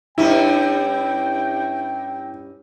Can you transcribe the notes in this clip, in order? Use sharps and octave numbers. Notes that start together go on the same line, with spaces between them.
G2 C#4 E4 G5